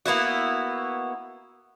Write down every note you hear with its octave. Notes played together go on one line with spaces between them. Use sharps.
A#3 B3 E4 F#4